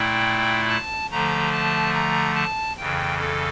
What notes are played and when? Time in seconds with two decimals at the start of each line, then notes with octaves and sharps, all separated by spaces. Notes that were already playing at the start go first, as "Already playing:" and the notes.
Already playing: A#2 A3 E4 G5
0.69 A5
1.10 D3 F3 A3 A#5
1.52 A5
1.94 A#5
2.35 A5
2.77 F2 C#3 E3 G5
3.19 A4